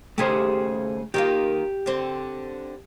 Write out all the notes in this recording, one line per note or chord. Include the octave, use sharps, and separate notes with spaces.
D#2 C#3 A3 G4 G#4 C5
D#3 A#3 F4 G4
D3 C4